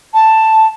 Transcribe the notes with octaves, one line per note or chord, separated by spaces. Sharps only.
A5